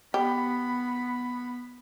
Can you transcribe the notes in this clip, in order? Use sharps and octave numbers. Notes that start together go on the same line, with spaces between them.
B3 G4 B5